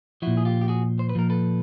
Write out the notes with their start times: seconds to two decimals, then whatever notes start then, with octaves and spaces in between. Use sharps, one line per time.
0.22 A#2 F3 E4 F#4
0.37 G#4
0.45 F4 G4
0.61 G4
0.68 F#4 G#4
0.99 C5
1.09 B4
1.15 A#2 F3 A#4
1.30 A4 B4